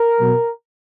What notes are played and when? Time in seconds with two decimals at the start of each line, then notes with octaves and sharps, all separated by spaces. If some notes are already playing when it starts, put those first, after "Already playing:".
Already playing: A#4
0.20 B2 F#3 B3